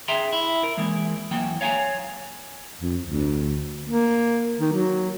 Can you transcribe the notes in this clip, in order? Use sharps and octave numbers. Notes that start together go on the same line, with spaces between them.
G#4 E5 G5 A#5 C6
E4
A#4
E3 G#3 A#3
E2 F#3 A#3 G5
C#5 F5 G#5 A#5
F2
D2
A#3
D#3
F#3